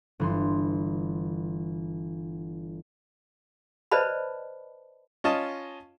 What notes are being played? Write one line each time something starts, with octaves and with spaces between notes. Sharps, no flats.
G1 E3 C6
B4 C5 D5 D#5 A5 B5
C#4 F4 D#5 A5